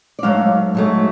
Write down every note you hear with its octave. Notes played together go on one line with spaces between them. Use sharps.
D5
G#2 F#3 A3 F5
G#2 F#3 A3